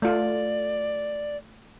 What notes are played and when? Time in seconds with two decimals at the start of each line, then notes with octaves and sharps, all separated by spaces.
0.02 A3 F4 D5